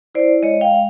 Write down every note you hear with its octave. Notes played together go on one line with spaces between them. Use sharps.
E4 C5 D5
G#3 C#5 D#5
F5 G5
G#3